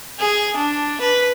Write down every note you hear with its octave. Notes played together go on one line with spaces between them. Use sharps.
G#4
D4
B4